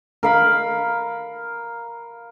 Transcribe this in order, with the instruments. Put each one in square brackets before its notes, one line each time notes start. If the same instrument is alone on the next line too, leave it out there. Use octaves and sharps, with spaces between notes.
[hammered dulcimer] A#4 F5 B5